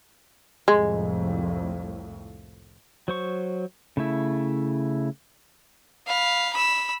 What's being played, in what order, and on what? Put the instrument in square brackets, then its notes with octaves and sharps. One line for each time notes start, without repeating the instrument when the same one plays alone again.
[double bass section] C2 F2 A2 [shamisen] G#3
[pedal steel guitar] F#3 C5 C#6
C#3 A3 E4
[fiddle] F5 B5
B5 E6